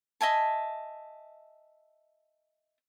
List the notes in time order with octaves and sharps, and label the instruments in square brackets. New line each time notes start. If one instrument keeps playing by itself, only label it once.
[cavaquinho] D#5 E5 G#5 A5